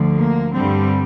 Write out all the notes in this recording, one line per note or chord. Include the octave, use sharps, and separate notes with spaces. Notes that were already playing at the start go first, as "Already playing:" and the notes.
Already playing: D2 D3 F3
A#3
G2 D3 G3 C4